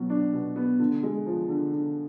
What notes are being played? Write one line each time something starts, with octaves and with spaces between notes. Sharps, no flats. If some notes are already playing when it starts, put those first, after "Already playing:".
Already playing: B2 F#3 B3
D4
B2
B3
D3
G#3
F3
D3
D3